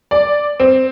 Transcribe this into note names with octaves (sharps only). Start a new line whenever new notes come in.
D5
C4